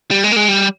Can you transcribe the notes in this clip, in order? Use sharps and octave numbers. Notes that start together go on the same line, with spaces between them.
G3
G#3
A#3
G#3
G3